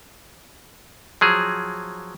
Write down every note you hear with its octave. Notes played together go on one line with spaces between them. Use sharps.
F3 F#3 G#4